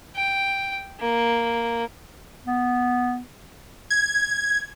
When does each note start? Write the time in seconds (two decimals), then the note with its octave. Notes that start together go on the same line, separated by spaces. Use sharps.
0.16 G5
1.00 A#3
2.46 B3
3.90 G#6